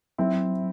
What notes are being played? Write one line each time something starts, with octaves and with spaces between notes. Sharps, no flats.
F#3 C4 E4